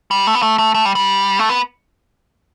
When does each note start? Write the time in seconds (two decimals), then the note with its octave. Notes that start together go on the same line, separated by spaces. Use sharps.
0.11 G3
0.27 A3
0.35 B3
0.42 A3
0.59 A3
0.74 A3
0.85 G3
0.95 G3
1.39 A3
1.49 B3